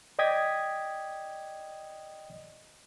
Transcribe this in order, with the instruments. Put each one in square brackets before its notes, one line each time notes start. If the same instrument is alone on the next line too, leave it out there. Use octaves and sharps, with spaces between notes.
[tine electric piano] D5 D#5 G5 D#6 G#6 B6